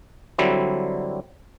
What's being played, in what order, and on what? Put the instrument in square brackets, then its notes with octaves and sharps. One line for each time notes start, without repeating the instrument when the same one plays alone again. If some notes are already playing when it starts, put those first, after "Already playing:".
[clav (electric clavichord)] D3 F#3 G3 C4 E4